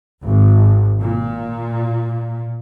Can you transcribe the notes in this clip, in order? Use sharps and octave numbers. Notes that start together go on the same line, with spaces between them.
G#1
A#2